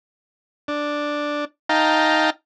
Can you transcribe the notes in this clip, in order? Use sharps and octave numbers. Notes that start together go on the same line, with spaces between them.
D4
D#4 F5 G5 A5 A#5